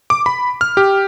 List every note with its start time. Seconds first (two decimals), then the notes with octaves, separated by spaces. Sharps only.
0.10 D6
0.26 B5
0.61 F6
0.77 G4